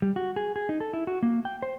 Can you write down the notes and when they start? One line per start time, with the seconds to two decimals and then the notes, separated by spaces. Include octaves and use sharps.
0.02 G3
0.16 F#4
0.36 G#4
0.56 G#4
0.69 D#4
0.80 A4
0.93 E4
1.07 F#4
1.23 A#3
1.45 G5
1.62 C5